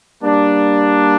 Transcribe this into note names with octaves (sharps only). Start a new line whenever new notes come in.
G3 A#3 D4